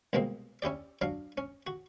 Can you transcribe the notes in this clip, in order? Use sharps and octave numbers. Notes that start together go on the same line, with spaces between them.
C2 B2 G#3 A#3 C4
C#4 E4 G4 D5
F#3 D4 F5
C#4
F#4